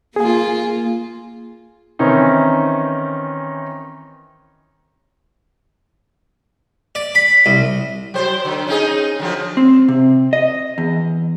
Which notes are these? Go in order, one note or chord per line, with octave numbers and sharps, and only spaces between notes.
A#3 F4 G#4 G#5
D#3 E3 C4 C#4 D#4
D5
B5
C2
F#3 C5
D3
C#4 D#4 G#4
D3 F3 F#3
C4
C3
D#5
E2